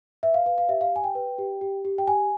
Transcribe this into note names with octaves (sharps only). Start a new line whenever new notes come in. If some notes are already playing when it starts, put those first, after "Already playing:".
B4 E5
F5
B4 F5
F5
G4 E5
F5
G4 G#5
G5
B4
G4
G4
G4
G5
G4 G#5